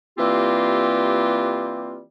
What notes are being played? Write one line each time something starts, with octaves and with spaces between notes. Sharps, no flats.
E3 G3 A#3 C4 F4 G4